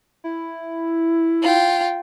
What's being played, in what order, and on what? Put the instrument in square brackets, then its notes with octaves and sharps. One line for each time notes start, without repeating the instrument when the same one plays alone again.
[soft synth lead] E4
[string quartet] F4 G5